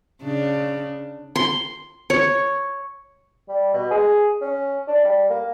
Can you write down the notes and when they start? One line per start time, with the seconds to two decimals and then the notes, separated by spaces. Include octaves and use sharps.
0.22 C#3 D4
1.36 C6
2.10 C#5
3.49 G3
3.74 B2
3.91 G#4
4.42 C#4
4.88 D4
5.05 G3
5.30 A#3